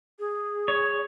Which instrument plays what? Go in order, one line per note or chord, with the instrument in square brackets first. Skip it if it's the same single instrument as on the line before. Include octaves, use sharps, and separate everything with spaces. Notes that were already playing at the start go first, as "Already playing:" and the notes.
[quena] G#4
[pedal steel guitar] C#5